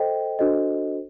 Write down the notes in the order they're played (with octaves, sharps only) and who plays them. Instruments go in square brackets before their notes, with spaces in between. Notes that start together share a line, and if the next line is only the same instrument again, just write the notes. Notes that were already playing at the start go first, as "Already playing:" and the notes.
Already playing: [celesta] A4 C5 D#5 G5
D4 F#4 A4 C5 D#5